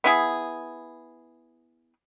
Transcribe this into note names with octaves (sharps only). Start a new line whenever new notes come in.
B3 E4 G#4